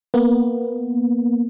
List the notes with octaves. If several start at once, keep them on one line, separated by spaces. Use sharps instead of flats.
A#3 B3